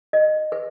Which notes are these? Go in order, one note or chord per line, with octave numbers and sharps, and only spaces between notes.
D#5
B4